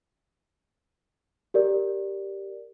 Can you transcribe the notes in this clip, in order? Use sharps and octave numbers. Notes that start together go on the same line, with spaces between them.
G4 A#4 D5